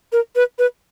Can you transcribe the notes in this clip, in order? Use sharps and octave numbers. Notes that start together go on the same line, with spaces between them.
A#4
B4
B4